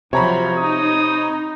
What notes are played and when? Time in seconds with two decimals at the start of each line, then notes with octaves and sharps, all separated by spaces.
0.13 C3 F3 F#3 C#5 A#5 B5
0.57 D#4 D#6